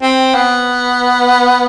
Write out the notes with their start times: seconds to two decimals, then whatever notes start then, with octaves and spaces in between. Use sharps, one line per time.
0.02 C4
0.34 B3